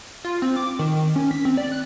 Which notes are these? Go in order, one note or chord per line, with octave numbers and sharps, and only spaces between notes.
F4
C4
D6
D#3
D#3
C#4
B6
C4
D5
F#6